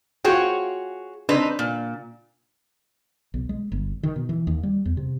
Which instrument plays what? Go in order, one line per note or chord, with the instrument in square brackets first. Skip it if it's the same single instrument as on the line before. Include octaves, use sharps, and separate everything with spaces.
[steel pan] F4 G5 [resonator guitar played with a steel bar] F#4 G#4 C#5
[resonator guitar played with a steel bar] C4 D#4 B4 [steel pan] D4
[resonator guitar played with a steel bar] A#2
[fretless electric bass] B1
G#3
G1
D#3
B2
E3
D#2
G3
E2
C3